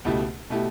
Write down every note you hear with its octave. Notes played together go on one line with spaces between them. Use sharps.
C#2 B2 A3 E4 G4
B2 A3 E4 G4